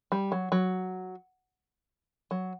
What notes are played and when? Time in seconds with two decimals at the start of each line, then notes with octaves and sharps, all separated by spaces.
0.12 G3
0.32 F#3
0.52 F#3
2.31 F#3